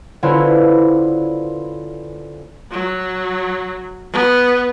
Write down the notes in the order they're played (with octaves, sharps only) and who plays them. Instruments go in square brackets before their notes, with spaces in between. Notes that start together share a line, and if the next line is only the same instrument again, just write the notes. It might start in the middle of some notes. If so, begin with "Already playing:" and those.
[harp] D3 C#4 E4 F4 B4 C5
[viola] F#3
B3